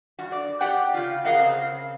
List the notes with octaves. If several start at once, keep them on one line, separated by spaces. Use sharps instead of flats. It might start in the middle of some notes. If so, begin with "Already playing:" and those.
G2 F#4
D5
G4 D5 F#5 G5
C#3 F4
G#4 A#4 D#5 F5 F#5
C#3 C4